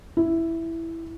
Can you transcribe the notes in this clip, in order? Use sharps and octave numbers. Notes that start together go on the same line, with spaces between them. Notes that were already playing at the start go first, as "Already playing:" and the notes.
E4